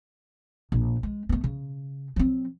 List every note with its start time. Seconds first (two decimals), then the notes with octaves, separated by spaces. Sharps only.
0.72 A#1
1.03 G#3
1.29 A3 B3
1.44 C#3
2.16 F#3 C4